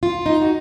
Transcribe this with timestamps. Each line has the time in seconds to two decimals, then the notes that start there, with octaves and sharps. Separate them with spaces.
0.03 F4
0.26 D#4
0.42 F#4